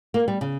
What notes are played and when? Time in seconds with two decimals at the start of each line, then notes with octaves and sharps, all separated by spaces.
0.14 A#3
0.28 G3
0.41 C#3